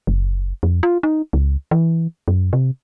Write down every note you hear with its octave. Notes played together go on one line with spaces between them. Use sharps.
F#1
F2
F4
D#4
C#2
E3
F#2
C3